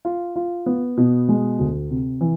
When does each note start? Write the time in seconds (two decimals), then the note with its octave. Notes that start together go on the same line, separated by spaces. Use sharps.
0.05 F4
0.36 F4
0.66 B3
0.97 B2
1.29 G#3
1.59 D2
1.90 C3
2.21 E3